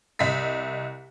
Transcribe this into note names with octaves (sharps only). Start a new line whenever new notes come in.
C2 D#5 E5 B6